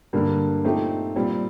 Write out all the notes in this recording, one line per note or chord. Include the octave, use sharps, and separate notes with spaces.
G2 D3 G3 A#3
A#2 A3 C4 D#4 G4
A#2 G3 C4